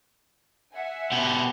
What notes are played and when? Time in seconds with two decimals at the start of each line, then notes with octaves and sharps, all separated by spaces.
0.73 E5 F#5 G#5
1.12 B2 G4